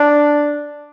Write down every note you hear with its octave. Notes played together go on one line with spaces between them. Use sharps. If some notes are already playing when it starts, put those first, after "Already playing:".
Already playing: D4